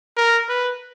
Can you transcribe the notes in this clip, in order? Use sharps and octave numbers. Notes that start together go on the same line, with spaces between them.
A#4
B4